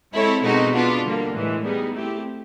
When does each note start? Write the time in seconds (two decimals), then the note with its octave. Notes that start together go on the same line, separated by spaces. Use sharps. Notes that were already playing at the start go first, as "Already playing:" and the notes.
0.13 G#3 C4 E4 A4 C#5
0.43 B2 G#3 C4 D#4 F#4
0.74 B3 D4 F4
1.04 D3 G3 A#3
1.34 A2 E3 G#3
1.64 G3 B3 D#4 G#4
1.94 A3 C4 E4 G4